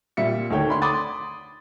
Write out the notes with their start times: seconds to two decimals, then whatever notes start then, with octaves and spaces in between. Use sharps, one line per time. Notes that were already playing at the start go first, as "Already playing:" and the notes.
0.17 A#2 G3 E5 C#7
0.50 D2 D#3 A4 C#5 G5
0.69 D4 B5 C6
0.82 B5 C6 D6 D#6 A6